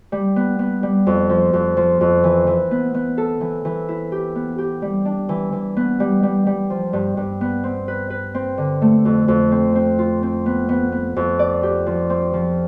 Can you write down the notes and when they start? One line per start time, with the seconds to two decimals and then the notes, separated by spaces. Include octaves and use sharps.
0.12 G3
0.36 B3
0.59 B3
0.83 G3
1.07 F2
1.29 F3
1.53 F2
1.77 F3
2.01 F2
2.24 E3
2.47 E3
2.71 B3
2.94 B3
3.18 A4
3.41 E3
3.65 E3
3.89 E4
4.12 G4
4.35 B3
4.58 G4
4.82 G3
5.05 D4
5.29 E3
5.53 E3
5.77 B3
6.00 G3
6.23 G3
6.46 G3
6.70 F3
6.93 G2
7.17 G2
7.41 B3
7.64 C4
7.88 B4
8.10 B4
8.34 C4
8.58 D3
8.82 A3
9.05 F2
9.28 F2
9.52 C4
9.75 C4
9.99 F4
10.23 C4
10.46 B3
10.69 B3
10.92 B3
11.16 F2
11.39 D5
11.63 G4
11.86 F3
12.10 C4
12.34 F3